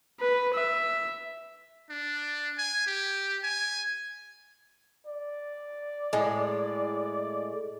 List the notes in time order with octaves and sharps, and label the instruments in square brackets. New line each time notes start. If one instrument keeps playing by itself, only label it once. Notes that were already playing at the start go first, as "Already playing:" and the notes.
[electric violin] B4
E5
[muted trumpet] D4
G#5
G4
G#5
[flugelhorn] D5
[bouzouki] A2 G#3